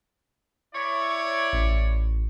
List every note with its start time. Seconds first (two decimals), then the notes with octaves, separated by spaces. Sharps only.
0.74 E4 C#5 D5
1.53 A1